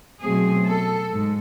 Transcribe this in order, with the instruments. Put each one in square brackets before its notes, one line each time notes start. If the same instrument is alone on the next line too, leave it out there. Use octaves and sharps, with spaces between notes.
[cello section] B2 F#3 A3 C4 G#4
A4
G#2